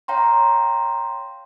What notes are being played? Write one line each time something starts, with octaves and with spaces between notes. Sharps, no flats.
C#5 F5 G5 A#5 C6